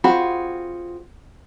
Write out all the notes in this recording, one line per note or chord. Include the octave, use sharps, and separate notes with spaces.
C4 F4 F#4 G#4 B5